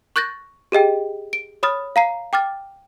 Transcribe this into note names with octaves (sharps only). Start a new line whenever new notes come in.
C#6 F#6 G6 A6 A#6
G4 G#4 D#5 G5
D7
C#5 B5 D#6 F6 A6
F5 A#5 C7
G5 D6 F6 A6